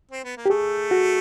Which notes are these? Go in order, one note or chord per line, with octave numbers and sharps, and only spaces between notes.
C4
B3
A#3
G4
A3 G#4
F#4